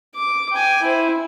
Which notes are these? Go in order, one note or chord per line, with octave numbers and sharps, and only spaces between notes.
D6
G5 G#5
E4 C5